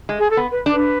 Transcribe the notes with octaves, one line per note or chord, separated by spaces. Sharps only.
G#3
G#4
A4
B3
B4
D4
B4